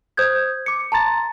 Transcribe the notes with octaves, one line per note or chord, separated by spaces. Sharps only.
C5 D#6 G6 G#6
D6 C#7
A5 A#5 C6 A6